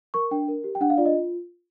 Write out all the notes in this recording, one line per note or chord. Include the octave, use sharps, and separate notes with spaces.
A#4 C#6
D4 G5
A#4
G4
G5
D4 F#5
F5
F4 D5
D#5